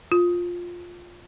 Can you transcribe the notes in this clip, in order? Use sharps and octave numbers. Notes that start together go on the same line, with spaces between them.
F4